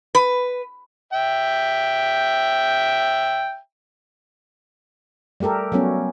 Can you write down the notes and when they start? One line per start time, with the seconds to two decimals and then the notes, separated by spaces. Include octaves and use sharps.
0.15 B4
1.13 E5 G5
5.40 G3 A3 G4 A4 A#4
5.72 F#3 G3 A3 B3 C#4 F#4